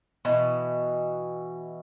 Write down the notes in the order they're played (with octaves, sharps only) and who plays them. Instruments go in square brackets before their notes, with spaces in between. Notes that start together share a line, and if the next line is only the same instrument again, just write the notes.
[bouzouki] B2 E3